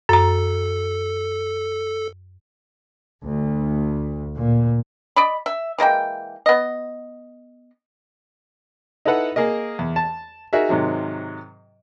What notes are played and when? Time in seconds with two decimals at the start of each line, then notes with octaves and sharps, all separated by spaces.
0.09 F#2 A4 A#5
3.23 D2
4.36 A#2
5.16 D5 D#5 B5
5.46 E5
5.78 E3 G#3 A#3 G5
6.46 B3 D#5
9.05 D#4 E4 A4 B4 F#5
9.36 A#3 G#4 A#4 D#5
9.79 E2
9.96 A5
10.53 D#4 F#4 G#4 A#4 E5
10.69 G#2 C3 D#3 F#3